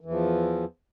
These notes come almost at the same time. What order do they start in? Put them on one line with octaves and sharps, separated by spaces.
E3 E2 F3